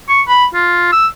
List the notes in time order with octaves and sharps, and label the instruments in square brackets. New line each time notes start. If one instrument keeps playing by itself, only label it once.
[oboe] C#6
B5
F4
E6